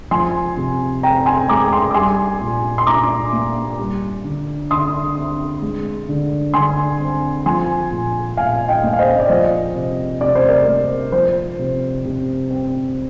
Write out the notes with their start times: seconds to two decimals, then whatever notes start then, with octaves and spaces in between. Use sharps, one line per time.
0.11 F3 G#5 C6
0.57 C3
1.03 C4 G5 A#5
1.26 G#5 C6
1.49 G#3 A#5 D6
1.72 G#5 C6
1.91 D6
1.94 G3 G#5 C6
2.41 A#2
2.78 C6
2.87 A#2 A#5 D6
3.33 A#3
3.79 G3
4.24 D3
4.71 D3 C6 D#6
5.16 C4
5.62 G#3
6.09 D3
6.54 D3 G#5 C6
7.00 C4
7.46 F3 G#5 C6
7.91 A#2
8.37 A#2 F5 G#5
8.68 D#5 G5
8.83 A#3
8.93 F5
8.99 C5 D#5
9.20 D5
9.29 F3 C5 D#5
9.75 C3
10.21 C3 D5
10.35 C5
10.49 A#4 D5
10.68 A#3
11.12 F3 C5
11.59 C3
12.05 C3
12.51 C4